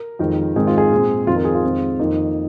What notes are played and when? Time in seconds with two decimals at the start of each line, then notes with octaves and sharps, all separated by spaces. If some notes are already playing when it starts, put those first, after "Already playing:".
Already playing: A#4
0.19 F2 D#3 G#3
0.56 G#2 D#3 G#3 C4 G#4
0.67 F4
0.78 G#4
0.92 A#2 G#3 C4
1.27 F2 D#3 C4 F4
1.36 A#4
1.45 G#4
1.55 F4
1.63 F2 D#3 G#3 C4
1.99 F2 D#3 A#3 D#4